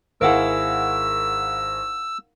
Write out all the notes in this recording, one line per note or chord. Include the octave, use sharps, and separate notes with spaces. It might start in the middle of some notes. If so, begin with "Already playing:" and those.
G#1 E4 G#4 A#4 F5 F#5 E6